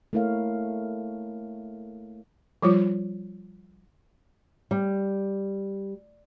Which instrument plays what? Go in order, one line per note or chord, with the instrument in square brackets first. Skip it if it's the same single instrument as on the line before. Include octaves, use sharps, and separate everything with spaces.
[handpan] A3 A#3 E4 A#4 C#5 F5
[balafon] F3 G3 F4
[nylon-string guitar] G3